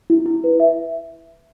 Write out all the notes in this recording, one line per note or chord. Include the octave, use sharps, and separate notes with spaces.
E4
E4
B4
E5